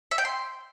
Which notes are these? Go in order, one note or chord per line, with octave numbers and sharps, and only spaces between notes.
E5
G5
C6